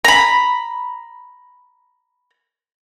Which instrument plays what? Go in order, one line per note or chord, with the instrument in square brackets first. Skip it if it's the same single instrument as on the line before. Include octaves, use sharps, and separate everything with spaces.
[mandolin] A#5 B5